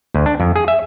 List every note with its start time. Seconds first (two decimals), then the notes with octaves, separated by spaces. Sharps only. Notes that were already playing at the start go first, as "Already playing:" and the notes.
0.14 D2
0.26 D4
0.40 F2
0.56 G#4
0.68 E5